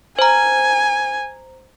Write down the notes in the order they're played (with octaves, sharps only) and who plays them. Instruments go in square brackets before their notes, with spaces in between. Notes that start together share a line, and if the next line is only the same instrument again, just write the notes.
[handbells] C5 A#5 [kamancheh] G#5